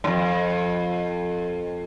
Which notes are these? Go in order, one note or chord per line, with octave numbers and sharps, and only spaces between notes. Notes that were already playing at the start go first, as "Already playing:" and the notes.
F2 A2